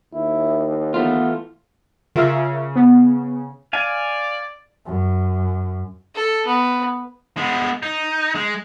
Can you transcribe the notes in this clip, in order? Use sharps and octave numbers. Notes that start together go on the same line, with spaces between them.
D#2 E4
E3 A3 B3 F4
C#3 F4 A#4 E5
B3
D5 F5 G#5
F#2
A4
B3
G#3 B3
D#4
G#3